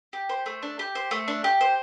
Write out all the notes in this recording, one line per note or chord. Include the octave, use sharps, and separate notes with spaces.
G4
C5
A3
D4
G4
C5
A3
D4
G4
C5